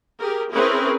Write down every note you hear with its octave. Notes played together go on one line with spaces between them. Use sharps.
G4 G#4 A#4
C4 C#4 E4 G#4 A#4 B4